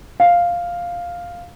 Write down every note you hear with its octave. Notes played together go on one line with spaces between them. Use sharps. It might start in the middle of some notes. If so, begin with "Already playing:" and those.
F5